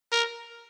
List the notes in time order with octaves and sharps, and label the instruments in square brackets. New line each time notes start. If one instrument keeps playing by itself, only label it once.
[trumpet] A#4